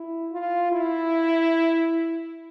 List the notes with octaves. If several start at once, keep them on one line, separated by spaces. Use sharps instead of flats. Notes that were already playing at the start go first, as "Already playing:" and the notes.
Already playing: E4
F4
E4